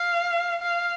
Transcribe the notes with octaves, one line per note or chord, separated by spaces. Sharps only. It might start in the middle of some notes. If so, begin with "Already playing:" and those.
Already playing: F5
F5